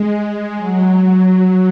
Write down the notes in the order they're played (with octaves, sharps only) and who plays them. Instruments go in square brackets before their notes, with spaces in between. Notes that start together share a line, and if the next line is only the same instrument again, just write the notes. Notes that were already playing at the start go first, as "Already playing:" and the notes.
Already playing: [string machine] G#3
F#3